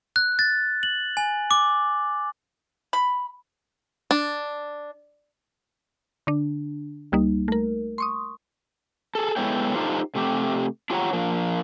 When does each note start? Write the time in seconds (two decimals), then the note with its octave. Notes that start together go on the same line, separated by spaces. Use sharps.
0.16 F#6
0.39 A6
0.83 F#7
1.17 G#5
1.51 D6
2.93 B5
4.11 D4
6.27 D3 D4
7.12 C#2 G3 A#3 D#4
7.48 A3 A#4
7.98 C6 C#6 D#6
9.15 G#4 A4
9.36 G#3 B3 E4 A4 C#5 G5
9.74 D4 D#4 F4 G4 A4 C5
10.15 C3 A3 G4
10.90 D4 F4 G4 C#5 F#5 A#5
11.13 F3 A#3 D4